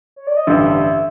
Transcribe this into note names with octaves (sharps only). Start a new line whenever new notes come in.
C#5
D5
D#5
A1 G2 D3 E5